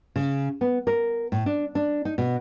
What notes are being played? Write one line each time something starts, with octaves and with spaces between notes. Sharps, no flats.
C#3
B3
A#4
A2
D4
D4
D#4
B2